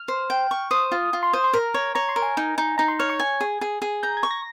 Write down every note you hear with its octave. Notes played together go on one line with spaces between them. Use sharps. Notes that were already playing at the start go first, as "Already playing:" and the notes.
Already playing: F6
C5
G5
C#6
C5 D#6
F4
F4
C6
C5 D#6
C6
A#4 A#5
C#5
C#5 A#5
C6
A#4
G#5
D#4
D#4
D#4 A#5
C6
C#5 F6
C#6
G#5
G#4
G#4
G#4
A#5 G6
G#6
C#6
A#6